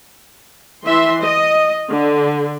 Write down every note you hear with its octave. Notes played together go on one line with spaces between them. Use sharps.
E3 E5 C6
D#5
D3